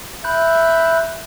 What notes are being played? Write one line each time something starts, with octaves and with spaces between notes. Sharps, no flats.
E5 B5 F#6 G6